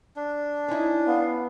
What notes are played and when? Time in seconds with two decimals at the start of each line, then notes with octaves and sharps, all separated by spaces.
0.16 D4
0.68 C#4 D#4 E4
1.07 B3 F5